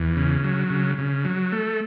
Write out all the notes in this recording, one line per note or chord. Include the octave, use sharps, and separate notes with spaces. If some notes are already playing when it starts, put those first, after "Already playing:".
Already playing: E2
C#3
F#3
C#3
C#3
F#3
A3